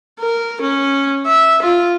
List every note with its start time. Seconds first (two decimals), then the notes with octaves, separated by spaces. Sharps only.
0.20 A#4
0.61 C#4
1.26 E5
1.62 F4